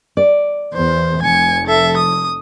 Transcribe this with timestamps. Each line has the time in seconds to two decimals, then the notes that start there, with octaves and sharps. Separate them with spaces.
0.17 D5
0.74 E2 C5
1.23 F1 G#5 C#7
1.67 A4 E5
1.97 D#6